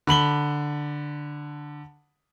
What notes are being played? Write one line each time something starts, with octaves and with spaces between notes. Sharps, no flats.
D3 B5 F#7 G7